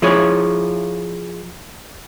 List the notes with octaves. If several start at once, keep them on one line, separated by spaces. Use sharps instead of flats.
F3 E4 G#4 C#5